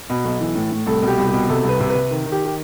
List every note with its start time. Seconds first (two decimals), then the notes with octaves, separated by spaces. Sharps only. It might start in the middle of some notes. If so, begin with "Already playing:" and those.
0.10 B2
0.24 B1
0.41 E3
0.55 A2
0.71 A2
0.86 C2 A4
1.02 B2
1.07 G4
1.18 C2
1.28 G4
1.33 B2
1.49 C3 A4
1.64 C2 B4
1.80 C3
1.90 B4
1.95 C3
2.11 D#3
2.26 D#3
2.32 G4
2.46 G4